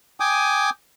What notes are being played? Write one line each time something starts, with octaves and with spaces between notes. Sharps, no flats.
G5 G#5 D6 D#6